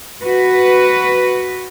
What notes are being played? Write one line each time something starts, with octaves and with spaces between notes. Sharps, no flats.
F#4 B4